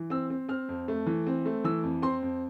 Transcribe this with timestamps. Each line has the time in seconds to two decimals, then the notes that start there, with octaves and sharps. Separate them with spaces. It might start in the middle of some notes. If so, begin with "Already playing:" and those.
Already playing: E3
0.10 C4 E6
0.30 C4
0.49 C4 F6
0.69 F2
0.88 A3
1.07 E3
1.27 C4
1.46 A3
1.64 E3 E6
1.83 F2
2.02 C4 C6
2.23 F2